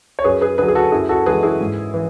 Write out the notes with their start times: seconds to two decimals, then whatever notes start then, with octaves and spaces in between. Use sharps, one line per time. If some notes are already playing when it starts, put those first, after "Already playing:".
0.19 C#5
0.24 F#2 G#4 B4
0.41 G#4 B4
0.58 D3 G#4 B4
0.62 F#3
0.68 G#4
0.75 F#4 A4
0.92 F#2 E4 G#4
1.09 F#4 A4
1.26 E3 G#3 G#4 B4
1.43 E4 G#4
1.61 G#2
1.94 E3